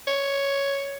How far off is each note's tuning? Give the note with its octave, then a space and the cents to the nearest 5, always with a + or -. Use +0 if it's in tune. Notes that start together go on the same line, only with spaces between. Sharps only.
C#5 +5